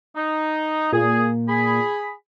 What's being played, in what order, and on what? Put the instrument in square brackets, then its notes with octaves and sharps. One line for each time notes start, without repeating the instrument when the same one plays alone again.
[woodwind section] D#4
[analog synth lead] A#2 [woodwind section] G#4
[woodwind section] G#4 B5